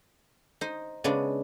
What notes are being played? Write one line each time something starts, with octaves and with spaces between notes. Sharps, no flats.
D#4 C5
C#3 G#3 B3 D4